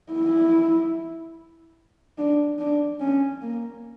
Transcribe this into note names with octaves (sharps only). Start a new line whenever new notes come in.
E4
D4
D4
C#4
A#3